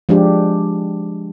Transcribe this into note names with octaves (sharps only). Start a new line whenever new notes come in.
F3 G#3 D4 G4